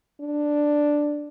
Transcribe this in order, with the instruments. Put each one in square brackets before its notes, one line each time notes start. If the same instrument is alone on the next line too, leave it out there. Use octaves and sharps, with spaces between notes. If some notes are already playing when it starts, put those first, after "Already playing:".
[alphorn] D4